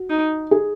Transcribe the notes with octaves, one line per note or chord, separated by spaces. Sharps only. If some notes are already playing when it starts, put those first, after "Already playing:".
Already playing: F#4
D#4
G#4